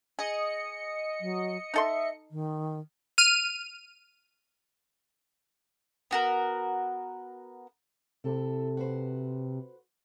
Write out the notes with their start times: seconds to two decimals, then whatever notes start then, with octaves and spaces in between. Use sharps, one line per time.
0.19 G#4 D#5 C#7
1.21 F#3
1.74 D#4 A4 E5 C6
2.31 D#3
3.18 F6 D#7
6.11 B3 F#4 A#4
8.24 C3 E4 A4
8.77 F#4 B4 C5